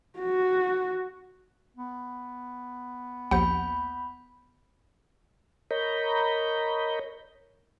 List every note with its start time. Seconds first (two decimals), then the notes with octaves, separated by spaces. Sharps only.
0.19 F#4
1.76 B3
3.31 A#1 D#2 F#5 B5 G6
5.71 A#4 C#5 D#5 A#5 B5 G6